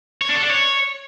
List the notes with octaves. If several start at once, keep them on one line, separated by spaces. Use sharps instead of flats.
C#5
D4
A4
D4
C#5